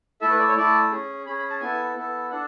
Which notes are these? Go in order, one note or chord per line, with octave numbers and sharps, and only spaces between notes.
A3 E4 A4 E5
B4
D5
C#5
A3 E4 A4 D5
C#4 G#4
C#4 G#4 B5
B5
A5
B3 E4 A4 G#5
B3 E4 A4
D4 A4 F#5